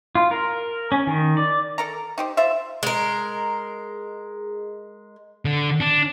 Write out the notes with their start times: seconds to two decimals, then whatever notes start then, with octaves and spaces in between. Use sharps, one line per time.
0.15 F4
0.31 A#4
0.92 C#4
1.07 D#3
1.37 D5
1.78 A4 A#4 A#5
2.18 D#4 G4 C5
2.37 F4 C5 E5
2.83 G#3 A#4
5.45 D3
5.80 D4